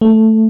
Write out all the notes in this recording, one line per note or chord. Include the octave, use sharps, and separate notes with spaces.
A3